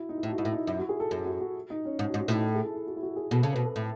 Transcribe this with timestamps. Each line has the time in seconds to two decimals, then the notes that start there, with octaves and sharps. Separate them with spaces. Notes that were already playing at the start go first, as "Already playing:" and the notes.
Already playing: E4 F#4
0.09 D#4
0.18 E4
0.23 A2 D#4
0.32 F#4
0.38 G#2 E4
0.45 A2
0.53 D#4
0.67 F#2 E4
0.79 F#4
0.89 G#4
1.00 A4
1.11 F#2 A4
1.25 F#4
1.41 F#4
1.70 D#4
1.85 C#4
1.99 G#2 D#4
2.10 F#4
2.14 G#2
2.21 F#4
2.28 A2 D#4
2.44 E4
2.55 G#4
2.65 E4
2.76 E4
2.87 F#4
2.96 E4
3.02 F#4
3.16 G#4
3.31 B2 A4
3.42 C#3 A4
3.53 B4
3.56 B2
3.64 A4
3.76 A2